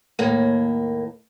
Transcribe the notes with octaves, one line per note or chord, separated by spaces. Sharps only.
D#2 A2 A#3